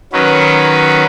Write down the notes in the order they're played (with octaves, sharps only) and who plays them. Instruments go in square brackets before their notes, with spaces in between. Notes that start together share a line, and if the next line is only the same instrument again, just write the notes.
[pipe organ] D#3 F#3 C#4 B4